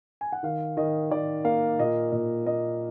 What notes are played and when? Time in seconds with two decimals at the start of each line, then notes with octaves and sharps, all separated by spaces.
0.21 G#5
0.32 F#5
0.43 D#3 F5
0.77 D#3 D#5
1.11 D#3 D5
1.44 A#3 F5
1.79 A#2 D#5
2.12 A#2 D#5
2.46 A#3 D#5